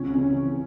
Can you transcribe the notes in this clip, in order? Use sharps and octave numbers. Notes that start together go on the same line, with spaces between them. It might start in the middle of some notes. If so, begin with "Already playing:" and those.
Already playing: C#2 C#4
E3 C#4